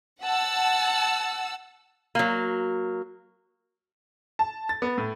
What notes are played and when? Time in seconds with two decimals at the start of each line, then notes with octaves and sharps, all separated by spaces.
0.22 F#5 A5 E6
2.15 F#3 A#3
4.39 A5
4.69 A6
4.82 B3
4.98 A2